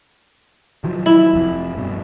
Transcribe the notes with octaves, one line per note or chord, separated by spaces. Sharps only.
D#3 F3 F#3
E4
F1 F2
G2 B2